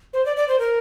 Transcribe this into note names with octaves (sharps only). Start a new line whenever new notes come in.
C5
D5
D5
C5
A#4